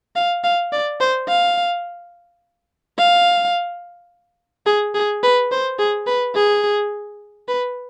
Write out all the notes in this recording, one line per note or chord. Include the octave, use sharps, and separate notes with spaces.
F5
F5
D5
C5
F5
F5
G#4
G#4
B4
C5
G#4
B4
G#4
B4